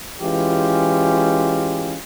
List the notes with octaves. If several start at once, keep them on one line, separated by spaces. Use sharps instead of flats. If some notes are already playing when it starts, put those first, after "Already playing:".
E3 G#3 C#4 F4 G4